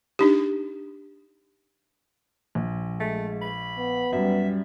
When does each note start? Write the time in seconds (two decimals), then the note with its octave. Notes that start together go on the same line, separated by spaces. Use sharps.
0.19 D4 D#4 G4
2.55 A#1
3.00 G#3 A3
3.42 B5
3.78 B3
4.12 F#2 G3 E5